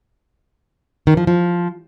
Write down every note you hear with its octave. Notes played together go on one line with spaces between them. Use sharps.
D#3
F3
F3